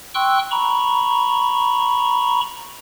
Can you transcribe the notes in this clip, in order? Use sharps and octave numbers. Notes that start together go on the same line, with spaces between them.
G5 C6 C#6 E6 F#6
A#5 B5 C#6